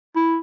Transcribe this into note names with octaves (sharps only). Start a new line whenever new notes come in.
E4